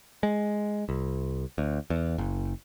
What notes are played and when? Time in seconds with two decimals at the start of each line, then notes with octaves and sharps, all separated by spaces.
0.23 G#3
0.89 C2
1.58 D2
1.90 E2
2.18 F#1